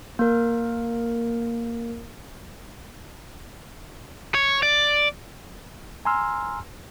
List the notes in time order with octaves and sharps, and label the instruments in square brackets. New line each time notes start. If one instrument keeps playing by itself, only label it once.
[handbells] A#3 A#4
[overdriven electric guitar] C#5
D5
[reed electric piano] G#5 A#5 C6 E6 F6